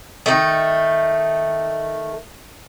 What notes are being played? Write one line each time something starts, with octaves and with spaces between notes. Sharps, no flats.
D#3 A3